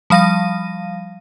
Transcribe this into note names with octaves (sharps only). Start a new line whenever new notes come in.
F3 G3 F5 A#6 D#7